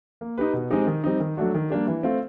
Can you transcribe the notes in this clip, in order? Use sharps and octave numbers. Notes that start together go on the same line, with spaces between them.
A#3
D#4 G4 B4
B2
G#3 C4 D#4 G4
D#3
G3 C4 D#4
D#3
F#3 A3 D4 F#4
D#3
G3 A#3 D4 G4
E3
A3 C4 F4